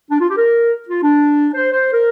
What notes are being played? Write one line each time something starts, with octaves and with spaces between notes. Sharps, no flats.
D4
F4
G4
A#4
F4
D4
C5
C5
A#4